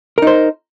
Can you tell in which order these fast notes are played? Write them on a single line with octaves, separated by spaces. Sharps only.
A#4 D#4 C5